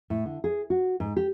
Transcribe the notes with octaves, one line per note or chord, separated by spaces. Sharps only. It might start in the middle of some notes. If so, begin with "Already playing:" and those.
A2
D3
G#4
F#4
G#2
G4